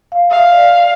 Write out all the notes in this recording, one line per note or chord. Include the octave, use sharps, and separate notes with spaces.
F5
E5 F5
D5